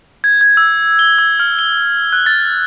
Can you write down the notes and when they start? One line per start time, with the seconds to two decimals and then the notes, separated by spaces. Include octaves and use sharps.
0.24 G#6
0.41 G#6
0.57 E6
0.99 G7
1.18 E6
1.40 F6
1.59 G7
2.13 F#6
2.26 A6